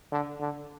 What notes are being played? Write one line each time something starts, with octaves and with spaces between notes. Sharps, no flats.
D3
D3